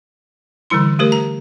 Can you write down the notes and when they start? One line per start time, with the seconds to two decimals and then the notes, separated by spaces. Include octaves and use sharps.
0.70 D3 E3 G3 E4 C6
0.99 A3 G4 A#4 C5
1.12 A#5